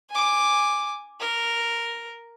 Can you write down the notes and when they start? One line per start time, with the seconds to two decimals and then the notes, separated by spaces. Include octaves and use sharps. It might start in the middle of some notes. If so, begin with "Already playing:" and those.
0.11 G#5 D6
1.20 A#4